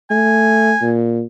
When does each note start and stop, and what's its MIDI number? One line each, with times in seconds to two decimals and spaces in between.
0.11 0.74 57
0.11 0.93 80
0.82 1.23 46